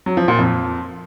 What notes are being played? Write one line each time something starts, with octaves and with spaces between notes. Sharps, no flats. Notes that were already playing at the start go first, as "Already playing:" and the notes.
F#3
F3
A#2
F2